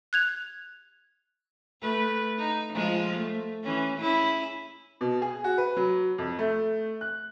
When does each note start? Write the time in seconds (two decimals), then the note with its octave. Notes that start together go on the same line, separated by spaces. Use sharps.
0.13 F#6 G#6 F7
1.81 A3 B4
2.38 D#4
2.72 F3 G#3 F4
3.15 A3
3.63 E3 C#4
3.98 C#4 E4 G#4
5.01 B2
5.22 G#4
5.44 F#4
5.58 B4
5.77 F#3
6.18 F2
6.39 A3
7.01 F#6